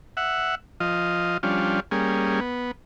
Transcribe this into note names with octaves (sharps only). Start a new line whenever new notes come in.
E5 F#5
F3 F4 D#5
F3 G3 C#4 D4 F4
G3 A#3 C#4 G#4
B3